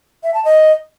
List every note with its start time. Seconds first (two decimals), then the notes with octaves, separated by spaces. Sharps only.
0.23 E5
0.34 A5
0.45 D#5